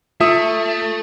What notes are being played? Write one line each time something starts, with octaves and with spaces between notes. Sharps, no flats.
A3 F4 E5 D#6